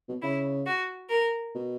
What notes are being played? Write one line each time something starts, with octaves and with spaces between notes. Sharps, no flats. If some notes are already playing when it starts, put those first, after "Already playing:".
B2
C#3 E4
F#4
A#4
B2